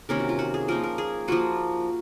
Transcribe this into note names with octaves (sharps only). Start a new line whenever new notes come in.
C3 D#3 A#3 C#4 A#4
F#4
F4
F#4
G#4
F3 A#3 D#4 A#4
A#4
G#4
F3 A#3 F4 F#4